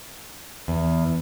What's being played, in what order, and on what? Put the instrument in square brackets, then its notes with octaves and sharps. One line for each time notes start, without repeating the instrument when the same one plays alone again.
[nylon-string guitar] E2